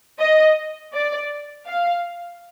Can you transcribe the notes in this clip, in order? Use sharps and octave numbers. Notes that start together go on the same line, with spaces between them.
D#5
D5
F5